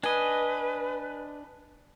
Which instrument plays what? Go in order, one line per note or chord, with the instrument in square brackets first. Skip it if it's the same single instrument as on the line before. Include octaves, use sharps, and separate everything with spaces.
[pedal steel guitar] D4 D#5 [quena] B4 [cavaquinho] G#5